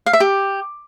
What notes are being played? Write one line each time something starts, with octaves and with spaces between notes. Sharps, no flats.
F5
E5
G4